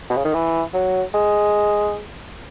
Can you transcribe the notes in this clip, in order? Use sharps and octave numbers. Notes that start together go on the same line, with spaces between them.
B2
C#3
D#3
E3
F#3
G#3